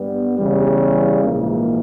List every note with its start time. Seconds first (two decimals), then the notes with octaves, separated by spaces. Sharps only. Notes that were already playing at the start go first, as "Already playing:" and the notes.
Already playing: G2 G3 B3
0.38 E2 C#3 E3 G3
1.23 A#1 G#2 E3 A#3